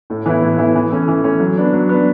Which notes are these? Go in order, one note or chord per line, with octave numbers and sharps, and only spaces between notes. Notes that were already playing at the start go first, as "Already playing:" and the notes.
A2
E3 B3 E4
A2
E3 B3 E4
E3
A3 C#4
E3
A3 C#4
F#3
B3 D4
F#3
B3 D4